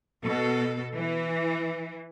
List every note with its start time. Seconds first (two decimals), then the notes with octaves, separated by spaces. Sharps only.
0.23 B2 A4
0.94 E3